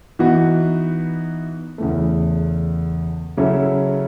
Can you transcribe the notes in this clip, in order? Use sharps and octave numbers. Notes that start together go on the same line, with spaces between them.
E3 B3 D#4 F#4
E2 C#3 E3 A3
C#3 F#3 C#4 E4 A4